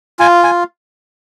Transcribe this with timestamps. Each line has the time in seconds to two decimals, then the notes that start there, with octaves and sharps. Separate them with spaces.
0.19 F4 G#5
0.44 G#5